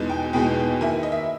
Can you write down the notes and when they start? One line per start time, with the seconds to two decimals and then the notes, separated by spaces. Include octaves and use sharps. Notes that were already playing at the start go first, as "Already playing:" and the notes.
Already playing: E2 B2 G#3 D#4
0.09 G5
0.33 E2 B2 G#3 D#4 G5
0.81 D#3 A#3 E4 G#5
1.03 D#5
1.12 E5